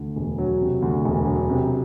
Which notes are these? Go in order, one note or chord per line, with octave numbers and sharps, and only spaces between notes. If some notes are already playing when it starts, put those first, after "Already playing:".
Already playing: D2
E1
F#3
C3
D2
E1
F#3
C3